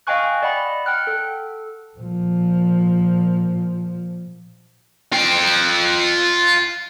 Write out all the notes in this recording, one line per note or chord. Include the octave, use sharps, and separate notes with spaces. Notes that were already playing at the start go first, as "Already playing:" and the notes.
D#5 F5 G5 G#5 C#6 F#6
D5 D#5 F#5 B5
F#5 G5 F6 F#6
A4
A#2 F3
F4 G5